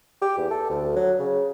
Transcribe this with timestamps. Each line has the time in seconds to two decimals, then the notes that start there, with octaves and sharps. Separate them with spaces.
0.22 G4
0.38 E2
0.51 A4
0.70 D2
0.96 F#3
1.19 C#3